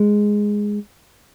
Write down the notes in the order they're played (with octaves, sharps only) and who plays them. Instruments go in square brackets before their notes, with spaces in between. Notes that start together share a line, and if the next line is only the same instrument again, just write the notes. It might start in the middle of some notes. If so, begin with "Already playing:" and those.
Already playing: [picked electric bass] G#3